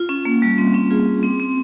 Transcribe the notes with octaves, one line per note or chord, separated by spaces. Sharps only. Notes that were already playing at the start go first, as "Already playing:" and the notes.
Already playing: F4
C#4
A#3
G3
C4
C#4
F4 G#4
C4
C4